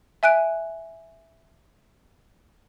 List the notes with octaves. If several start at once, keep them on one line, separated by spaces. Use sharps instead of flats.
E5 G#5 F#6 D7